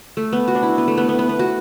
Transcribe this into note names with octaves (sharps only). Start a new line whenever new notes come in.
A3
B3
F#4
D4
E4
B3
A3
B3
B3
B3
B3
F#4